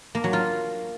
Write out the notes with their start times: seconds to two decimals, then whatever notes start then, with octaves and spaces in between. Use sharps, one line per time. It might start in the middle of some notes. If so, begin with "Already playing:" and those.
0.15 A#3
0.24 F#3
0.33 F4